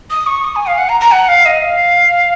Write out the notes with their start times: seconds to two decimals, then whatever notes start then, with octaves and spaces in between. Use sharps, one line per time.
0.11 D#6
0.27 C#6
0.44 D#6
0.56 G#5
0.67 F5
0.78 F#5
0.89 A#5
1.01 A#5
1.12 F#5
1.28 F5
1.45 D#5
1.62 F5